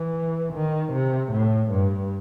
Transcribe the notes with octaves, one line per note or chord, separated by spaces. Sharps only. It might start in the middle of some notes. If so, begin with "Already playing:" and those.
Already playing: E3
D#3
C3
A2
G2